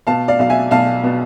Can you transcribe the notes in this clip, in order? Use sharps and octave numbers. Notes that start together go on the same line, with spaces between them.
B2 F5 A5
D5 F5
B1 F5
E5 G#5
B1 F5 A5
B2